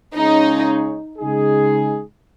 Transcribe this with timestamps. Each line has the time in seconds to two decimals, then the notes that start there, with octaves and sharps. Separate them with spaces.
0.15 C#3 G#3 C#4 D#4 G#4 C#5
1.18 C#3 G#3 D#4 G#4